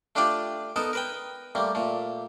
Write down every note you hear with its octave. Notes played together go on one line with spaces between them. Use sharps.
A3 D4 F4 G4 D5
B3 D#4 A4 A#4
A#4 B4 G5
G3 A3 A#3
A#2 A3